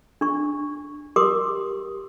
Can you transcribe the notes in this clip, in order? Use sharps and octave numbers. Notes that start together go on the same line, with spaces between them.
D4 C#6
G4 A#4 C6 D6 D#6